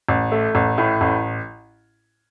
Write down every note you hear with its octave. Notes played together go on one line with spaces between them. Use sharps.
A1
A3
A1
A2
A1